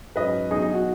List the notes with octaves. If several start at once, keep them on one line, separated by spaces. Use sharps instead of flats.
G#2 F#3 C#4 B4 D#5
B1 B2 F#3 D#4 G#4
D#4
F#4